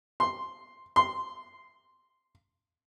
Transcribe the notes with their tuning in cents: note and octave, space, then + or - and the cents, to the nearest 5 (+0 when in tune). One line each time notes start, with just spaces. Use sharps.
C6 +0
C6 -5